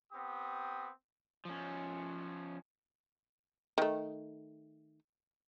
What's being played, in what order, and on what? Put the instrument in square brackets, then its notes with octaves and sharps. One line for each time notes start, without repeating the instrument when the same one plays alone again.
[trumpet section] B3 C4 G4 D#6
[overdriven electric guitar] F3 C#4
[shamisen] D#3 A3